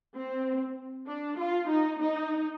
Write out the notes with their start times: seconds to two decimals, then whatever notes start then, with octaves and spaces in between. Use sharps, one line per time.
0.16 C4
1.07 D4
1.38 F4
1.69 D#4
2.00 D#4